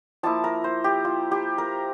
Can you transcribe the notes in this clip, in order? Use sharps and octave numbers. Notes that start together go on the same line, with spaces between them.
F3 A#3 E4 A5
A#4
C5
G4
F4
G4
A#4